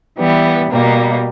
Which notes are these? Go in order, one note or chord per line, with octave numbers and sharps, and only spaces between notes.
E3 G3 B3
B2 G3 A#3